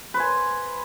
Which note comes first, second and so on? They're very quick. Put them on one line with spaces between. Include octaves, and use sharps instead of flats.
B4 C5 G#5